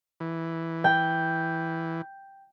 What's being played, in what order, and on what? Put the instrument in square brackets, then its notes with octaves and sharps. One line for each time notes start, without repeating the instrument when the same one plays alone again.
[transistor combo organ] E3
[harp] G5